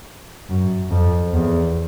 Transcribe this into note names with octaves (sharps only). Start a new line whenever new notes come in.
F#2
F2
E2